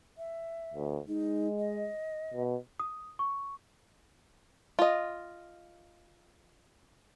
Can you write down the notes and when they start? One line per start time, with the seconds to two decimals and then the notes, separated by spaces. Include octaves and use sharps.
0.18 E5
0.74 D2
1.08 G#3 D#4
1.59 D#5
2.34 B2
2.80 D#6
3.19 C#6
4.79 F4 D#5